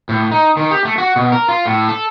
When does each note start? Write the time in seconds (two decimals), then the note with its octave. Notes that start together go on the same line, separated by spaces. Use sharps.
0.09 A2
0.31 D#4
0.57 D#3
0.71 G4
0.85 A3
0.98 F#4
1.16 B2
1.32 A#4
1.49 F4
1.66 A2
1.89 A4